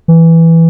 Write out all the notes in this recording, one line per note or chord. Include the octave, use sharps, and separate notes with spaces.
E3